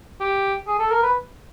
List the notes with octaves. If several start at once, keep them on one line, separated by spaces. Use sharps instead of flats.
G4
G#4
A4
A#4
B4